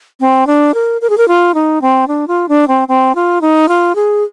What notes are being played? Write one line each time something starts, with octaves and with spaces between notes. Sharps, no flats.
C4
D4
A#4
A#4
G#4
A#4
F4
D#4
C4
D4
F4
D4
C4
C4
F4
D#4
F4
G#4